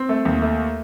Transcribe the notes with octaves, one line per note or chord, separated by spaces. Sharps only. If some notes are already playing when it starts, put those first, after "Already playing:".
Already playing: C4
A3
D#2
A3